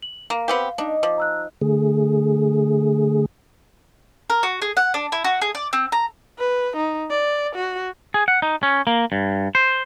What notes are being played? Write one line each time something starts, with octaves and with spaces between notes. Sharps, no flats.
F#7
A#3 A#4 F5
B3 C4 G4 F5
D4 D#4
F3 D6
A#5 E6 F#6
D3 A3 G#4
A#4
F#4
G#4
F#5
D4
E4
F#4
G#4
D5
C4
A#5
B4
D#4
D5
F#4
G#4
F#5
D#4
C#4
A#3
G2
C5